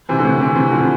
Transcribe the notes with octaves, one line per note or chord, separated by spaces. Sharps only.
C3 E3
D3
A2 C3
C3 E3
C3 E3
D3 F3
C3